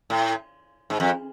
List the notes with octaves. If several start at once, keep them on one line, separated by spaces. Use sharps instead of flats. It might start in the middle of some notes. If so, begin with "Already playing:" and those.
A2
G#2
F2